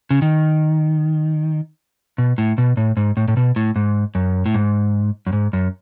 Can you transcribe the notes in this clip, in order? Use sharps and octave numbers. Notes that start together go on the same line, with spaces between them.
C#3
D#3
B2
A2
B2
A2
G#2
A2
A2
B2
A2
G#2
F#2
A2
G#2
F#2
G#2
F#2